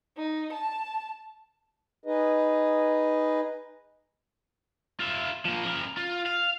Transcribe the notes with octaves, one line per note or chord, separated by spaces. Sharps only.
D#4
A5
D#4 G#4 B4 D#5
F4 E5
F3 A#3
C#3 A#4
F4
F5